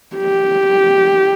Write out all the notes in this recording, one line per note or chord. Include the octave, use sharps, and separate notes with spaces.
G4